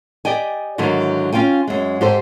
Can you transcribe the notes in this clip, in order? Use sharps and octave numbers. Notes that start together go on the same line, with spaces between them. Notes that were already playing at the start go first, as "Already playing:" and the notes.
G4 D5 D#5 G5 G#5
G#2 D3 D#3 F#3 E4
C#4 F4 F5 G5 G#5
F#2 G#3
G#2 G4 A4 C5